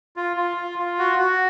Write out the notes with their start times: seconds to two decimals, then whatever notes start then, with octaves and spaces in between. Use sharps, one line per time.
0.16 F4
0.37 F4
0.57 F4
0.78 F4
0.99 F#4
1.19 F#4